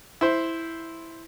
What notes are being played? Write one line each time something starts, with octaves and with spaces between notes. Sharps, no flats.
E4 C5